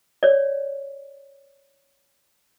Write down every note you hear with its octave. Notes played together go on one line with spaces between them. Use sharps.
C#5 D5